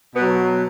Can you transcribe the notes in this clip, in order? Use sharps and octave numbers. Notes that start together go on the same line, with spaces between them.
B2 F#3 B3